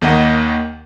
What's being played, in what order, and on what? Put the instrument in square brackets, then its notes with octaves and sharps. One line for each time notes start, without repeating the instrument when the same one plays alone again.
[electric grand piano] D#2 D#3 A#3 D#5 F#5